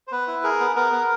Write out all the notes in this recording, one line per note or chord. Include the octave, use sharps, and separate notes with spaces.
C5
B3 B4
E4
G#4 A#4
B3
B3 A#4
B3